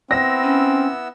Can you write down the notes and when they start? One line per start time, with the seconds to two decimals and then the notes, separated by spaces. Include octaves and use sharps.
0.11 B3 C4 E4 E6 A#6
0.43 C#4